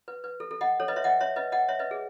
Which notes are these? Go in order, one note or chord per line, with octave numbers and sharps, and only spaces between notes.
B4
B4
A4
A4
D#5 F#5
A4 C#5
B4 D#5
C#5 E5
D#5 F#5
C#5 E5
B4 D#5
D#5 F#5
C#5 E5
B4 D#5
G#4